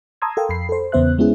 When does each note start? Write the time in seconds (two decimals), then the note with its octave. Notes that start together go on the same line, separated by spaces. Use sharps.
0.22 A5 A#5 C6 D#6 E6 G#6
0.37 A4 A#4 F5 G5
0.49 F2 B5 C7
0.69 A4 C5
0.92 E2 C#3 B3 C5 E5 F#6
1.18 G#3 B3 C#4 E4 G#4